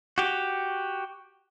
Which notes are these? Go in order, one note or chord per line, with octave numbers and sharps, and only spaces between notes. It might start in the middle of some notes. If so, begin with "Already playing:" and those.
F#4 G4